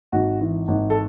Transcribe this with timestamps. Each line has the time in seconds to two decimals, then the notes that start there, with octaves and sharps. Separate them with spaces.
0.12 G#1 F#4
0.40 E3
0.68 G#1
0.90 A4